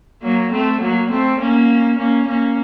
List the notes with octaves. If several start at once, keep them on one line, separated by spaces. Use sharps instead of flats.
F#3 A#3
A3 C4
F#3 A#3
A3 C4
A#3 C#4
A#3 C#4
A#3 C#4